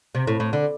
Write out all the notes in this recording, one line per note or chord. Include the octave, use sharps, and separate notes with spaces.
C3
A2
A2
D3